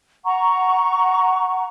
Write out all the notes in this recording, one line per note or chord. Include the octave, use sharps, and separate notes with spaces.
F#5 A#5 C#6